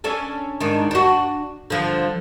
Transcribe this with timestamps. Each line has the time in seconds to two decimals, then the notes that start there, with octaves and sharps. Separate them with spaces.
0.04 C#4 D4 A4
0.60 G#2 D#3 D4
0.91 D4 F#4
1.70 D3 F3